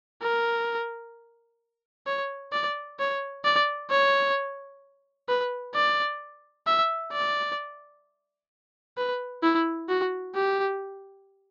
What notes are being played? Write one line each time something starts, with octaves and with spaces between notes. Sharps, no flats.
A#4
C#5
D5
C#5
D5
C#5
B4
D5
E5
D5
B4
E4
F#4
G4